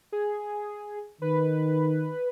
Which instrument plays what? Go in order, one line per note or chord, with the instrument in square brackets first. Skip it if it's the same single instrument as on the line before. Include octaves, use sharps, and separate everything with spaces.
[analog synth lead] G#4
[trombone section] D#3 [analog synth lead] B4